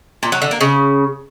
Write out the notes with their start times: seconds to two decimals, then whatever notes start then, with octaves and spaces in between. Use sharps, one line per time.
0.23 A#2
0.32 F#3
0.42 D3
0.51 A#3
0.61 C#3